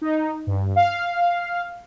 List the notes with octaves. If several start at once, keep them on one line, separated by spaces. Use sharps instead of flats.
D#4
G2
F5